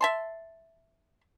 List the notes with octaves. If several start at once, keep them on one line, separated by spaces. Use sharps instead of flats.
E5 A5 C6